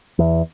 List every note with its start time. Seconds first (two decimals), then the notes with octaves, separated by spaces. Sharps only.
0.19 E2